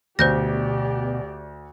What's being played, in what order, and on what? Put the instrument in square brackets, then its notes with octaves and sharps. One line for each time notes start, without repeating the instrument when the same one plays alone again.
[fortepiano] D2 [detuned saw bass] B2 [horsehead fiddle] G4 D5 [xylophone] C5 G6 A#6